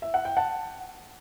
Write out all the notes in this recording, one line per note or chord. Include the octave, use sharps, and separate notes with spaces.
E5
F#5
G5
F#5 A5